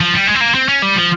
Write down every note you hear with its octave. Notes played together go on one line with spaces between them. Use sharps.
F3
G3
G#3
C4
A#3
C4
C#4
G3
F3